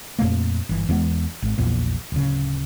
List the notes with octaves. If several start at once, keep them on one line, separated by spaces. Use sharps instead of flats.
F2 A#2 A3 A#3
G1 E3
E2 E3 G#3 B3
G#1
A#1 E2 A#2
D1 C#3